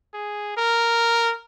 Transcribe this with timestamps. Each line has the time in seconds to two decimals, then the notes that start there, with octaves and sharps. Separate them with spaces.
0.14 G#4
0.57 A#4